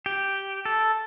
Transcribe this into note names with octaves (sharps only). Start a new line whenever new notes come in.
G4
A4